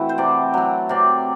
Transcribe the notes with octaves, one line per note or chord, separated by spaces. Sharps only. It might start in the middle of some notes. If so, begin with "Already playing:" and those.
Already playing: E3 A3 C4 E4 F#4
C5
C3 D5
F#3 C4
C3 D5